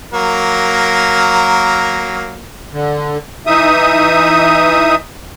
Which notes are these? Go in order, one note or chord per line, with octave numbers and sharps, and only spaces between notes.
F#3 A#3 A#4
D3
E3 D#4 E5 D#6